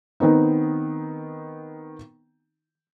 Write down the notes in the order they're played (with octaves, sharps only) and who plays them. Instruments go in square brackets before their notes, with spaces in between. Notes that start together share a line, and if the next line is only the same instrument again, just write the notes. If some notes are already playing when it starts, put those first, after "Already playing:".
[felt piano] D#3 B3 C4 D#4